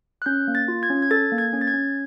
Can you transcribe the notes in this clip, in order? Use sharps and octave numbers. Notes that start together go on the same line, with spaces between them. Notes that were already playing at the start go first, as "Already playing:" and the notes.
F#6
C#4 G6
A#3
A6
F4
G#6
C#4
G#6
A4 A6
A#3
G#6
C#4
A6
G#6
C#4